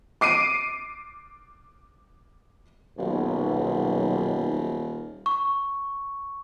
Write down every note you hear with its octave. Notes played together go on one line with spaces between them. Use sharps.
D6 C7 D7 D#7
D#1 B1
C#6